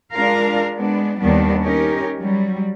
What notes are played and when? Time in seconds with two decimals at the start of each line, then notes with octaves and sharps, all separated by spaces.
0.12 G#3 D4 F4 A#4 F5
0.77 G#3 B3 D4
1.20 D#2 D#3 G3 B3 D4
1.63 C#4 D#4 G4 A#4
2.18 F#3 G3